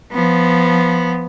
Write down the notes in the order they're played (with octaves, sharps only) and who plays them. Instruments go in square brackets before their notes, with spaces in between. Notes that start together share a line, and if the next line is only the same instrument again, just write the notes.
[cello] F3 B3